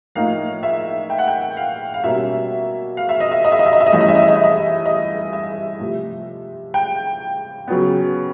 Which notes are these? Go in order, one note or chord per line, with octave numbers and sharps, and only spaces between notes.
A2 F3 A#3 D#4 F5
E5
G5
F#5
G5
F5
F5
B2 G3 A#3 C#4 E5
F5
E5
D#5
E5
D#5
E5
D#5
E5
D#5
E5
D#5
G2 E3 A3 C#4 E5
D#5
E5
D#5
E5
D#5
E5
D#5
D#5
E5
C3 F3 A3
G5
C#3 F#3 B3